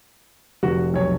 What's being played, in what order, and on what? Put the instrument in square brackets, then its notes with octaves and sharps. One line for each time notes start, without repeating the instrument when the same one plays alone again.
[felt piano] F1 [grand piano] F#4
[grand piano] B1 C#5